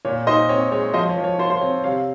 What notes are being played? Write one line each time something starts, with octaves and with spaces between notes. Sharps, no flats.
A#2 C#5
D#4 C5 D#5
C4 C#5
G#3 C#5
F3 C5 D#5
C#5
F3
C#5
F4 C5
C5
C4 C#5
C3 C#5 F5